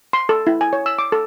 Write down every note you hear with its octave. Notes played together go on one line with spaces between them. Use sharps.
C6
A4
E4
G#5
C#5
E6
D6
A4